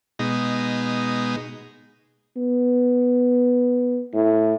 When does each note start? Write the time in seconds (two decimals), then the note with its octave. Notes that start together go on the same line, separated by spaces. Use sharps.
0.19 B2 G#3 D#4
2.37 B3
4.14 A2